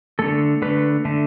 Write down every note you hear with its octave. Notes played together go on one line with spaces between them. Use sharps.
D3 A3 A4
D3 A3 B4
D3 A3